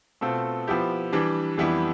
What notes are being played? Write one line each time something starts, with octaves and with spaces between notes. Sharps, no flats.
B2 A3 C4 F4 A4
F3 B3 E4 G4
E3 G3 D4
F2 E3 G3 B3 E4